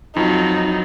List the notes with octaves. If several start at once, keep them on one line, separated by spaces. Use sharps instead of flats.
F2 F#3 D#4